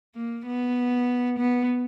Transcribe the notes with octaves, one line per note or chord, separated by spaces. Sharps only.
A#3
B3
B3